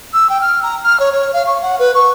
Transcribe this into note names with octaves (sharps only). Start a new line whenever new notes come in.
E6
G5
F6
A#5
F6
C#5
C#5
F5
C#6
F#5
B4
C#6